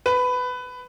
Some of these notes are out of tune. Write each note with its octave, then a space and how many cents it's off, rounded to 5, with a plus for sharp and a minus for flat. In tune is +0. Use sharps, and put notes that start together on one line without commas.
B4 +15